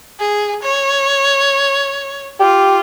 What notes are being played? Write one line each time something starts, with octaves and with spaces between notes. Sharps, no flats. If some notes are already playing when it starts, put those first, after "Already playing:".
G#4
C#5
F4 G4